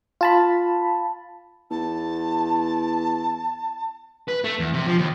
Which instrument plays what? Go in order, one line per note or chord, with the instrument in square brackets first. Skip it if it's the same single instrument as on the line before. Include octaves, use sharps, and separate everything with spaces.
[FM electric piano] F4 A5 B5
[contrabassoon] E2 [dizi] A5
[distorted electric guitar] B4
A3
E2
C3
F3
D#2